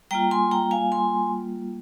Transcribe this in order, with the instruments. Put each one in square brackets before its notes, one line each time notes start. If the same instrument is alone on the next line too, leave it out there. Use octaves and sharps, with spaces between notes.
[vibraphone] G3 A#3 F4 G5 A#5
G#5 C6
G5 A#5
F5 G#5
G#5 C6